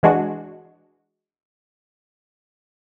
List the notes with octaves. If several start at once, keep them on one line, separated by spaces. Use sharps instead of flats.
E3 G#3 D4 F#4